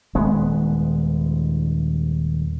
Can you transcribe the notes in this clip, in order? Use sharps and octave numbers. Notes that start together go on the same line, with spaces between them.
D#1 G#3 B3